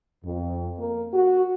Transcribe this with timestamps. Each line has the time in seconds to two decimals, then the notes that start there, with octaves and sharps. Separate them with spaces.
0.23 F2
0.78 A#3
1.13 F#4